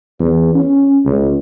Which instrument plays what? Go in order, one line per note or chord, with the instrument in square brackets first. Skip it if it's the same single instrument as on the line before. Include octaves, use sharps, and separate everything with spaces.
[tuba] E2
C#4
C#2